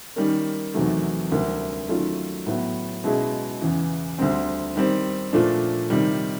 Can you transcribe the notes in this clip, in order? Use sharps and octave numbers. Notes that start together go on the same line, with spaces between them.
D#3 G3 A#3 C#4
E2 C3 D#3 F#3 A3
D2 C3 E3 G3 A#3
D#3 F#3 A3 C#4 F4
A2 F#3 B3 E4
B2 G#3 C#4 E4 G#4
E2 C#3 E3
D2 D3 G3 C4
D#3 G3 C4
A#2 F3 A3 D4
C3 D#3 G3